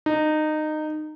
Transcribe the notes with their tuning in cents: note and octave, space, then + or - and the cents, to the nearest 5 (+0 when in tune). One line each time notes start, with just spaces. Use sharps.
D#4 -20